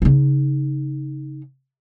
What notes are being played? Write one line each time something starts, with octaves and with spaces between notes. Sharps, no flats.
C#3 D#4